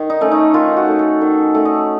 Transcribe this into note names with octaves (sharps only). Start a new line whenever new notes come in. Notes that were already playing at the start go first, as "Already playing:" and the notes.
Already playing: D#3
D#4
A3 C#4
D#4
D#3 F4
F#4
A3 C#4
A4
D#3
A3 C#4
D#5